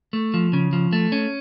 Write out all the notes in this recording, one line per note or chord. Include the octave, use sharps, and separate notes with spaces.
A3
F3
C#3
F3
A3
C#4